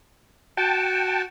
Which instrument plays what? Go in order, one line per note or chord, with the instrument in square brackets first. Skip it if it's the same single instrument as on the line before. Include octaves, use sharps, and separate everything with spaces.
[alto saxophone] F#4 [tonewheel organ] G5 A5